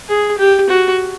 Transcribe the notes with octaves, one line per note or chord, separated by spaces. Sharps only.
G#4
G4
F#4